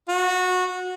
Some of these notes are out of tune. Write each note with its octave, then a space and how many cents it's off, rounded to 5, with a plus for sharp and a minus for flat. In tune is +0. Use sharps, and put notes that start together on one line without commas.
F#4 -20